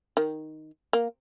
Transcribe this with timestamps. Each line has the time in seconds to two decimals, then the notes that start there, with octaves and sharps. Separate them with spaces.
0.17 D#3
0.93 A#3